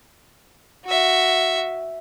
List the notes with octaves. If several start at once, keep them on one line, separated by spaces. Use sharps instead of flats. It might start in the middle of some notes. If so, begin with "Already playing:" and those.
F#4 E5